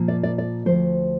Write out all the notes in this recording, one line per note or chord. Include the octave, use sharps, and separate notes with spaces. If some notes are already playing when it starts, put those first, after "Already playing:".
Already playing: A#2 F3 A#3
D5
D5
D5
D2 C3 F3 C5